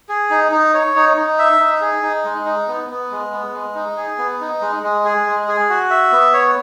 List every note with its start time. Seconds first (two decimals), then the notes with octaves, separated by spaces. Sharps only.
0.09 G#4
0.30 D#4
0.52 D#4
0.74 C#5
0.96 D#4
1.17 D#4
1.39 E5
1.59 D#4
1.81 G#4
2.03 D#4
2.24 G#3
2.46 D#4
2.68 B3
2.90 B3
3.11 G#3
3.32 B3
3.54 G#3
3.75 D#4
3.97 G#4
4.18 B3
4.41 D#4
4.61 G#3
4.83 G#3
5.05 G#4
5.26 G#3
5.48 G#4
5.69 F#4
5.90 E5
6.12 B3
6.34 C#5